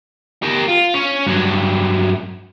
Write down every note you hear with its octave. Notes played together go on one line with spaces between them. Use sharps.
G4 A#4
F4
C#4
G2 F#3